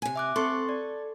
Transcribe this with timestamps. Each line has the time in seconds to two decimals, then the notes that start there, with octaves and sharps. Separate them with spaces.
0.02 C3 G#5
0.16 E5 D6 F#6
0.36 C4 A4 C6 C#6
0.69 D5